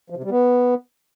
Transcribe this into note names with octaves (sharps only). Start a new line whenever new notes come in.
F3
C3
G3
B3